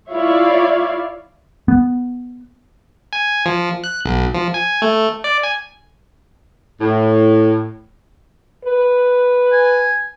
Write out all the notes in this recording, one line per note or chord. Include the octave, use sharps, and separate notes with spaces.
E4 F4 C#5 D5 E5 F5
B3
G#5
F3
F#6
B1
F3
G#5
A3
D5
G#5
A2
B4
G#5